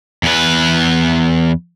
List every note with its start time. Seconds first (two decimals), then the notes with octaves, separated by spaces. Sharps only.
0.23 E2 B4